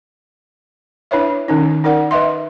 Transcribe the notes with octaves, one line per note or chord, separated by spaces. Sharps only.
D4 E4 B4 C#5 E5
D#3 C#4 D#4
D#4 A#4 D5 F#5
B4 D#5 E5 C6